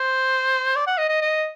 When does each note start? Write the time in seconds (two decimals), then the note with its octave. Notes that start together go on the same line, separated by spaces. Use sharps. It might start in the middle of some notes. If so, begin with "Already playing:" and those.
Already playing: C5
0.75 D5
0.87 F#5
0.98 D#5
1.09 D#5
1.21 D#5